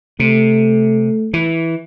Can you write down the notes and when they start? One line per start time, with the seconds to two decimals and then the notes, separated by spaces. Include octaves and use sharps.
0.20 C3 A3
1.34 E3